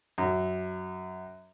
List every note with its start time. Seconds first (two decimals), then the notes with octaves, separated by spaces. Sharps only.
0.18 F#2